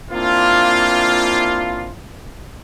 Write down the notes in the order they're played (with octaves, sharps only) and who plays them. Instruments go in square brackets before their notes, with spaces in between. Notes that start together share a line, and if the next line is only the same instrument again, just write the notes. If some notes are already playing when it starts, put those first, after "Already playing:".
[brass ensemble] A#3 C4 D4 E4 F4